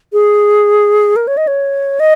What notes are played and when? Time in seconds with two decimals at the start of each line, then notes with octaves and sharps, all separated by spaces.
0.13 G#4
1.16 A#4
1.27 C#5
1.37 D#5
1.47 C#5
2.00 D#5